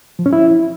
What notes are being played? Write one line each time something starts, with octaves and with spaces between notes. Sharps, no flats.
F3
C#4
E4